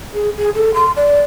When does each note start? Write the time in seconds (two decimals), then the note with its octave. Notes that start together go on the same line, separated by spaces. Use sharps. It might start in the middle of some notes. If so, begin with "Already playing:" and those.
0.14 G#4
0.37 G#4
0.55 A4
0.74 C6
0.96 D5